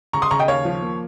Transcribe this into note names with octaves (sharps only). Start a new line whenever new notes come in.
C#3 A#5 C#6
C6 D#6
C#3 A#5 C#6
D#5 G5
D#2 C#5 F5
F3
A#3